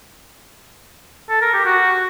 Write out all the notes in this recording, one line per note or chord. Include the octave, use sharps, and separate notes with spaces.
A4
A#4
G4
F#4